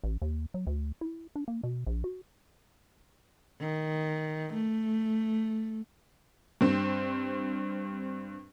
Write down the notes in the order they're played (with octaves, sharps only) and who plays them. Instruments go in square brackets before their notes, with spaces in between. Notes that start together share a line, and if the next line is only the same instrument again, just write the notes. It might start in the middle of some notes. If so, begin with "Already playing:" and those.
[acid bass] A1
D#2
F#3
D2
E4
D4
A#3
B2
A#1
F#4
[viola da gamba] D#3
A3
[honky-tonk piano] G2 C4